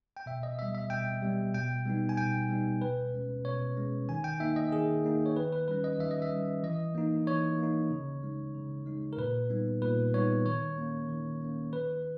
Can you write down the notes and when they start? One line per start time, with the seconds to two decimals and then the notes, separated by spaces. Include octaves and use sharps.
0.17 G5
0.26 B2 E5
0.43 D#5
0.59 G3 B3 E5
0.75 E5
0.90 B2 G5
1.22 G3 B3
1.54 B2 G5
1.86 G3 B3 D#4
2.09 G#5
2.17 B2 G5
2.49 G3 B3 D#4
2.82 B2 B4
3.14 G#3 C#4
3.45 B2 C#5
3.77 G#3 C#4
4.09 D#3 G#5
4.24 G5
4.40 A#3 D#4 E5
4.56 D#5
4.72 D#3 G#4
5.04 A#3 D#4
5.26 C#5
5.36 D#3 B4
5.52 B4
5.68 G3 C#4 B4
5.84 D#5
5.99 D#3 E5
6.11 D#5
6.22 E5
6.32 G3 C#4
6.63 E3 D#5
6.95 A#3 D#4
7.27 E3 C#5
7.58 A#3 D#4
7.91 C#3
8.23 G#3 D#4
8.55 C#3
8.86 G#3 D#4
9.13 A#4
9.18 A#2 B4
9.50 G3 B3 D#4
9.82 A#2 B4
10.14 G3 B3 D#4 C#5
10.45 D#3 C#5
10.77 A#3 C#4
11.09 D#3
11.42 A#3 C#4
11.72 D#3 B4